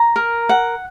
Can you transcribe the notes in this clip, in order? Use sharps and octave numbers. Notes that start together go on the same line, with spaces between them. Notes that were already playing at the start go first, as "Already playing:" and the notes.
Already playing: A#5
A#4
F#5